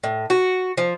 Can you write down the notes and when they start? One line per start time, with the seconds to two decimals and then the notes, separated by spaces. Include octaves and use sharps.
0.04 A2
0.30 F#4
0.77 F3